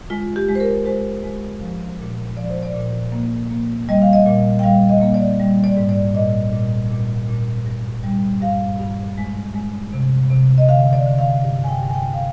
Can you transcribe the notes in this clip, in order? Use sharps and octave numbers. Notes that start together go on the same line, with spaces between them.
G#3 F4
G4
G#3
C5
A#4
G#3 C5
G#3
F3
A#2
F3 D5
C5
D5
A#2
A#3
A#3
G3 D#5
F5
D#5
A#2
G5
G3 F5
D#5
A#3
D5
G3
D5
G#2
D5
A#2 D#5
A#2
A#2
A#2
G2
G3
G2 F5
G2
G#3
G#3
C3
C3
D#5
D3 F5
D5
D3
F5
G2
G#5
G5
G2
G#5
G5
F5